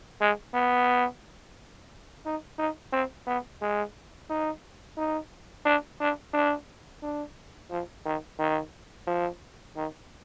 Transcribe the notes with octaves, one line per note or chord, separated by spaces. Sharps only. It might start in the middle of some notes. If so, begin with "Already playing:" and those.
G#3
B3
D#4
D#4
C4
B3
G#3
D#4
D#4
D4
D4
D4
D4
F3
D#3
D#3
F3
D#3